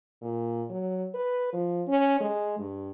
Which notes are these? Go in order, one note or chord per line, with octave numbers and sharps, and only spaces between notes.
A#2
F#3
B4
F3
C#4
G#3
G2